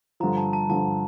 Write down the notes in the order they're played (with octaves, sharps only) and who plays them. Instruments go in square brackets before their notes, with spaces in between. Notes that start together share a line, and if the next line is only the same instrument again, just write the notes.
[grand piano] G2 D3 F3 [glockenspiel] A#5
[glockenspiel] A5
A5
[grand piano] G2 D3 F3 [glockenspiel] A5